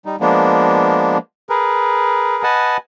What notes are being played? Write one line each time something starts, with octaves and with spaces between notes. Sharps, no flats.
G3 D#4
F3 G#3 A#3 B3 D4
G#4 A#4 B4
B4 D#5 F#5 G#5 A5